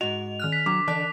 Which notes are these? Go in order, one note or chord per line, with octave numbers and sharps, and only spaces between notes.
G#2 F#4 D#5 F7
D#3 F6 F#6
B6
F#3 D4 D6
D3 E3 D5 A5 F#6